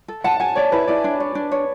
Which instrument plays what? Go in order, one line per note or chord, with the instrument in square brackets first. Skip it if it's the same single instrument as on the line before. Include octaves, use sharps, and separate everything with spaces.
[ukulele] A4
[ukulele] F#5 [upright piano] A5
[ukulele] F#5 [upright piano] G#5
[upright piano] C#5 [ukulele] D5
[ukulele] E4 [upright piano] B4
[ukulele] E4 [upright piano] D5
[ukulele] D4
C#5
D4
C#5